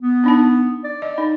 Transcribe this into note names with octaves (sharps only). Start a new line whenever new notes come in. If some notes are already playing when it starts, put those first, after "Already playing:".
B3
D4 D#4 A5
D5
D#5
D#4